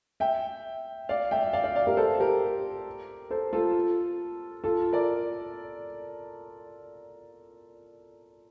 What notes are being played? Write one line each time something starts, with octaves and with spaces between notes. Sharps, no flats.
E5 G5
D5 F5
E5 G5
E5
D5 F5
D5 F5
D5 F5
G4 A#4
A4 C5
G4 A#4
A4 C5
F4 A4
F4 A4
A#4 D5